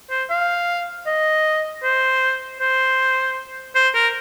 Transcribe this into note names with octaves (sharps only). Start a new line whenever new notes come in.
C5
F5
D#5
C5
C5
C5
A#4